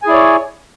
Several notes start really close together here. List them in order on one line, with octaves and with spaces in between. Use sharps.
G#5 G#4 E4 D5 C#5